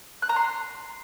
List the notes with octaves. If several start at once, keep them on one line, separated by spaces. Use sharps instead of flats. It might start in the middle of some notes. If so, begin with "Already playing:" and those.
F#6
A#5
C6